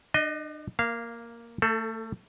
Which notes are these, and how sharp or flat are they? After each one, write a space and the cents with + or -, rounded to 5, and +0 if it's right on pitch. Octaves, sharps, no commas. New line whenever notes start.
D4 +40 D#5 +0
A#3 +0 F5 -20
A3 +30 A4 +0